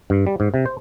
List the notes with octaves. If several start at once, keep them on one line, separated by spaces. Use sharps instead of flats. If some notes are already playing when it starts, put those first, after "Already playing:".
G2
G3
G#2
C3
C5